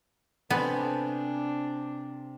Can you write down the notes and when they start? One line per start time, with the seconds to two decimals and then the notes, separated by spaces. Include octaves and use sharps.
0.50 C3 B3 D4 A4 B4 C5 G#5